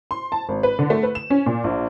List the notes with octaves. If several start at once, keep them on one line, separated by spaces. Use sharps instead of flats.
C6
A5
G#1
B4
D3
A3
B4
E7
C#4
A#2
A#1